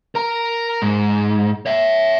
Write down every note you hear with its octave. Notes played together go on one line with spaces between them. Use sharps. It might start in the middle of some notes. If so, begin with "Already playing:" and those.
A#4 A#5
G#2
C#5 E5